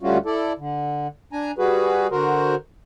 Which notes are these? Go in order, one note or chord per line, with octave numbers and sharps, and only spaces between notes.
D2 G3 A3 C#4 F4 F#4
E4 A4 D5
D3
D4 G#5 A#5
G3 F#4 G#4 B4
D3 F#4 A#4 C5